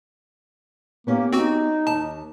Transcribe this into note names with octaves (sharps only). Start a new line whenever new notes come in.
A#3 B3 C#4 G4
C4 D#4 F#4
D#2 A5